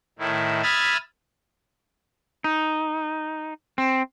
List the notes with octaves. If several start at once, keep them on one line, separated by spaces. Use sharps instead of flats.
A2 D#3 E4
E5 B5 D#6 F6 G#6 A6
D#4
C4